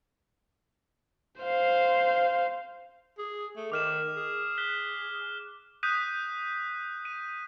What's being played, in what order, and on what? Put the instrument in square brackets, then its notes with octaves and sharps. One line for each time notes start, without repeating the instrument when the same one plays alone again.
[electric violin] C5 F5
[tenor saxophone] G#4
A3
[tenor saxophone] D#3 [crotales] D6 F6 E7
[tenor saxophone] G#4
[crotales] F#6 B6 G7
D#6 F#6 G6 B6 D#7
D#7